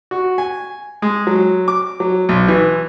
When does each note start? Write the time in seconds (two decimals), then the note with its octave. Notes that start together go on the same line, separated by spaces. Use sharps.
0.11 F#4
0.38 G#5
1.02 G#3
1.27 F#3
1.68 D6
2.00 F#3
2.29 B1
2.48 E3